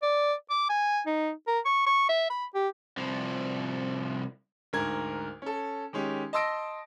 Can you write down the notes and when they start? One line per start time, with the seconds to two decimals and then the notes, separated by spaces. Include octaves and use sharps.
0.02 D5
0.50 D6
0.70 G#5
1.06 D#4
1.47 A#4
1.65 C#6
1.87 C#6
2.09 E5
2.30 B5
2.55 G4
2.97 C2 F3
4.73 D2 G#2 A#4 G#6
5.42 C#4 A4
5.93 D#3 G#3 C#4 G4
6.33 D#5 A5 C6 E6 A#6 D7